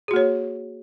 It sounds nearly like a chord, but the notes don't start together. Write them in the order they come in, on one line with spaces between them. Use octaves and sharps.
G#4 F#4 A#3 C#5